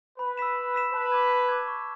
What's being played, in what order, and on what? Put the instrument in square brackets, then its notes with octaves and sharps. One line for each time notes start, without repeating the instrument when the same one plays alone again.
[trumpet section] B4 [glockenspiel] B5
[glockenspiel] E6 B6 E7
B5
E6 B6 E7
[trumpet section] B4 [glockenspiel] A5
[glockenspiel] D6 G#6
A5
D6 G#6
C#6